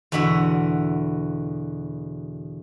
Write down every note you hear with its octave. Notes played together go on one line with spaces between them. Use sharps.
E2 B2 D3 F#4 E5